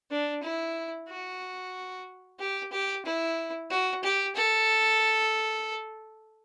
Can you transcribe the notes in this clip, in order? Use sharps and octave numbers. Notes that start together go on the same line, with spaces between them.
D4
E4
F#4
G4
G4
E4
F#4
G4
A4